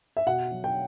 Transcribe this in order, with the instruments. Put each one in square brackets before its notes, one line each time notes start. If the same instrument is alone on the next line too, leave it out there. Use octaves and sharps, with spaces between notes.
[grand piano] E5
B2 F#5
F#3
G5